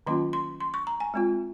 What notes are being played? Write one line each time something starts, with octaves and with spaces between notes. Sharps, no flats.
D#3 F#3 A#3 C#4 F4 C6
C6
C6
C#6
A#5
G#5
G#3 C4 F4